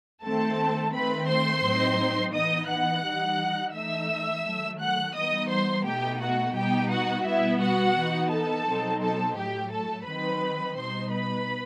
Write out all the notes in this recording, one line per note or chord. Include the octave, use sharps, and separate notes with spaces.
D#3 A3 C4 A4 A5
D#3 A3 C4 B4 B5
C5 C6
A2 F#3 C4 D#4
E3 B3 D#4 D#5 D#6
F#5 F#6
E3 G3 D#4
E3 A3 D#4 E5 E6
D#3 F#3 A3
F#5 F#6
E3 G3 B3 D#4 D#5 D#6
C5 C6
B2 A3 D#4 G4 G5
F#4 F#5
B2 G3 B3 D#4 G4 G5
F#4 F#5
B2 G3 B3 E4 E5
F#4 F#5
E3 B3 D#4
A4 A5
B2 F#3 C4 D#4
A4 A5
A2 F#3 A3 G4 G5
A4 A5
D#3 F#3 C4 D#4 B4 B5
B2 G3 D#4 C5 C6
B4 B5